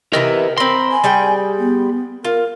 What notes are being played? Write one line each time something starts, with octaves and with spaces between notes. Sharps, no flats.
C3 E3 B3 A#4 D#5
C4 A#4 B5 C6
G#5
G3 G#4 G5
B3
F4 A#4